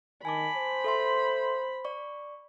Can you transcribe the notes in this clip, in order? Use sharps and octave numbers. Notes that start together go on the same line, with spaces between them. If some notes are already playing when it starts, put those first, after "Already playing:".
D#3 G#5 A5 B5 D6
C5
A4 E5 C6
D5 C#6